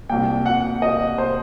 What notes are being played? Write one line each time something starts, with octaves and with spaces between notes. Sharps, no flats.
C2 A#2 G5
F#5
D#5
C5